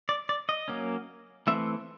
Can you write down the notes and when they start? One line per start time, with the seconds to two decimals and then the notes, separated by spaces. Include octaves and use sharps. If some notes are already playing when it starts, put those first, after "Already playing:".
0.09 D5
0.29 D5
0.49 D#5
0.68 F#3 A#3 C#4
1.47 E3 A3 C4 E5